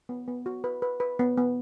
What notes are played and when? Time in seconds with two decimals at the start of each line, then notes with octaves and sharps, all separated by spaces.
0.09 B3
0.28 B3
0.46 F#4
0.64 B4
0.82 B4
1.00 B4
1.19 B3
1.37 B3